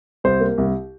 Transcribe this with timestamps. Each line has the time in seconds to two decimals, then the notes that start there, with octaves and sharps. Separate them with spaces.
0.24 C2 C5
0.40 A#3
0.58 C2